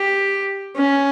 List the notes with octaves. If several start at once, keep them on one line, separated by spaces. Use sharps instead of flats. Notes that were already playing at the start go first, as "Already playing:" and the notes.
Already playing: G4
C#4